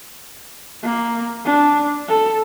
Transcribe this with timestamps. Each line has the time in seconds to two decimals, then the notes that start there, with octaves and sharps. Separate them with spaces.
0.83 A#3
1.45 D4
2.08 A4